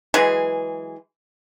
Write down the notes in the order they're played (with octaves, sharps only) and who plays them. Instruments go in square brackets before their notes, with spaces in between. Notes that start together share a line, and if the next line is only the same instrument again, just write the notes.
[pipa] E3 F#3 G#3 G#4